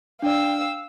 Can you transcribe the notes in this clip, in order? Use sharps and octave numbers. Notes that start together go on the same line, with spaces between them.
D4 D5 F5 G5 E6